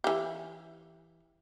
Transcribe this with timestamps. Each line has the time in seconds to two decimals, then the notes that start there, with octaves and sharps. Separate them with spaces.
0.04 E3 G4